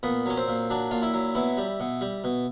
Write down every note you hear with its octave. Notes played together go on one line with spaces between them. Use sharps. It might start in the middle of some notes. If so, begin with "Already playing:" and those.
A#2 B3
F#3 C#4
C4
A#2
F#3 D4
A#2 F4
E4
F#3
B2 E4
G3
B2
G3
B2